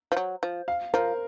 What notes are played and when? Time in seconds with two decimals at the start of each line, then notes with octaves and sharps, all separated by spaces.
0.12 F3
0.17 F#3
0.43 F3
0.68 F5
0.94 F3 A#4